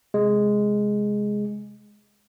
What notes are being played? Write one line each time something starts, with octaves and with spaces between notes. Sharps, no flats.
C3 G#3